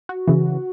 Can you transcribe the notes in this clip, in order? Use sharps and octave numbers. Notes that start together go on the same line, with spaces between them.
F#4
C#3 E3